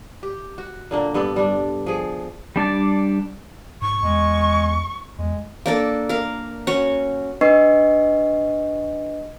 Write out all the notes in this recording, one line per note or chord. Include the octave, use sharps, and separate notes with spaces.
G4
F#4
A#2 D3 A#3
G2 B3 A4 D5
G3 D4
F3 G#4
G3 D4 D5 A5
G#2 C#6
E2 G#3
E2 G#3
A#3 D4 A4
A#4 F5
C#4 F#4 F#5 C#6
D4 B4 D#5 C#6 C7